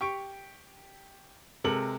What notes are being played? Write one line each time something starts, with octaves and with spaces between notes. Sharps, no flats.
G4 C#6 D7
C3 G#3 A4 A#4 F#7